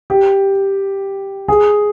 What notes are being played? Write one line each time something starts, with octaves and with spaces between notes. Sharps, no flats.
G4
G#4